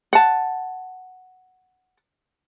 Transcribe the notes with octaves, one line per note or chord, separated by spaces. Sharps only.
F#5 A5